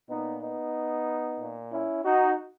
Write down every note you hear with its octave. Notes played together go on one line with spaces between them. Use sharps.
A#2 B3 D#4
B3 D#4
A#2
C#4 E4
D#4 F#4